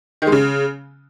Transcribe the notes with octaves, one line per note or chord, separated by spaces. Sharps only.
D#3
G#3
C#3